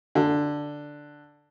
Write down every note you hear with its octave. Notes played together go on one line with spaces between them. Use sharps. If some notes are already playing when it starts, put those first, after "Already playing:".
D3